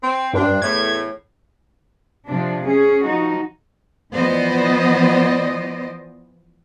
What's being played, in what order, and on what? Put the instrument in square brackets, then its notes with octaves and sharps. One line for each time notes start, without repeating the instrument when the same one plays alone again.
[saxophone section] C4
[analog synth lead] G2 [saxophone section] C4 D4
[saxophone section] E2 A2 A3 [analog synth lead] G#6
[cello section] C3 F3 D4
C#4 G#4
F3 D#4 F#4
E3 F3 B3 C5 D5 D#5